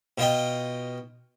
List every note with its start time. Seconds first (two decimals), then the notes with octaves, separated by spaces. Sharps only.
0.18 B2 F4 D#5 G5